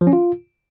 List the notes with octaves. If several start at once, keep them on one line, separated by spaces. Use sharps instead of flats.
F3
C#4
F4